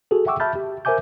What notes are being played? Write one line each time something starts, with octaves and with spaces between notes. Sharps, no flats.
F#4 G#4 A4
E5 F#5 G5 C#6 D6 E6
E5 A5 B5 F6 G6 A6
G4
A#4 C5 E5 G#5 D6 G6